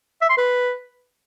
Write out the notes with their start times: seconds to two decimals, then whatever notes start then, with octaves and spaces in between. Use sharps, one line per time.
0.22 E5
0.30 C6
0.38 B4